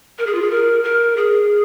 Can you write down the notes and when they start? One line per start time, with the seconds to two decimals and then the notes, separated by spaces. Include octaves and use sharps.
0.18 A#4
0.26 G#4
0.35 F4
0.42 G#4
0.51 A#4
0.84 A#4
1.16 G#4